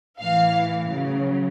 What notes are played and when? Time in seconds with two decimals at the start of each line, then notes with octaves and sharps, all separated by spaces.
0.20 A2 E3 F5
0.90 C#3 F#3